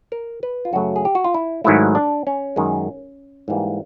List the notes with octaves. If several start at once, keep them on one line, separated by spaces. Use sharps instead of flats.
A#4
B4
F4
F#2 C#3 F#3 A3 F#4
G#4
G4
F#4
F4
E4
G#2 D#3 F#3 A3 E4
D4
C#4
F#2 D#3 G#3
G#2 E3 G3 A#3